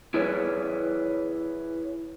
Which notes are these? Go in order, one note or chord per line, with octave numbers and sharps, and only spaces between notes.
E4 G#4 B4 C#5